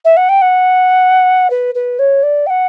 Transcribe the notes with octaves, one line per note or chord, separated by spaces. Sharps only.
E5
F#5
G5
F#5
B4
B4
C#5
D5
G5
F#5